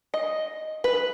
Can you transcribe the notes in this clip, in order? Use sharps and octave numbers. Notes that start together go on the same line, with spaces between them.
D#5
B4